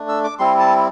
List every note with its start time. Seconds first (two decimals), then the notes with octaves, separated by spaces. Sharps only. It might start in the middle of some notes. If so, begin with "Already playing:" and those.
Already playing: A3 D4
0.09 E6
0.24 D6
0.39 G3 C4 E4 C6
0.59 A5